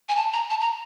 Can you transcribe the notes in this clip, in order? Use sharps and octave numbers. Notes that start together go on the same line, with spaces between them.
G#5
A5
A#5
A5
A#5